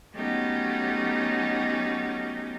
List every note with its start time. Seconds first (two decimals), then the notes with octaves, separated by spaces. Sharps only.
0.14 F#3 A3 B3 C#4 D#4 G4